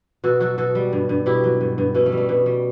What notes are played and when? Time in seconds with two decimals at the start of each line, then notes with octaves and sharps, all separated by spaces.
0.24 B2 F#4 A4
0.40 F#3 F#4 A4
0.58 B2 F#4 A4
0.75 G3
0.92 G2
1.09 G2
1.26 B2 E4 G4
1.44 F#3
1.61 G2
1.78 G2
1.94 B2 A3 C#4
2.06 A3
2.12 G3
2.18 A3
2.29 B2
2.46 G3